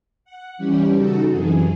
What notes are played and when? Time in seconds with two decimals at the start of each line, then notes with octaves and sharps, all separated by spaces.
0.25 F#5
0.57 E3 G3 C#4 G4
0.95 C#3 D#4 F#4 A4
1.30 F#2 C3 E3 G#4